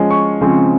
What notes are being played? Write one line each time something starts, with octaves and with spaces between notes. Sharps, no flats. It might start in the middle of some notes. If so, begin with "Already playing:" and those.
Already playing: F3 G#3 C#4
C#6
C#3 F3 G#3 C4